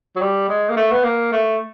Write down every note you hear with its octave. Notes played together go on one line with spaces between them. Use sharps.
F#3
G3
G#3
A#3
A3
B3
A#3
A3